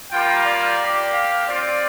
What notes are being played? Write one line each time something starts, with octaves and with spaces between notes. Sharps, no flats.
G3 A#3 F4 G5
D5
A#3 G4
F5
C4 F4 D5